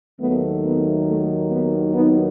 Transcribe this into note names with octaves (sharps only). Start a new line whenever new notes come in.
D#2 D#3 F#3 A3 B3
B3
A3
B3
B3 D#4